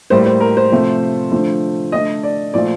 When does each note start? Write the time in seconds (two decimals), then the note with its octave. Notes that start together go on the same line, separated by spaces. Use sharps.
0.10 A2 G3 A#3 C5
0.26 C5
0.40 A#4
0.57 C5
0.72 C3 F3 A3
1.32 D3 F3 A3
1.92 D3 A3 D#5
2.23 D5
2.54 A#2 F3 A3 D5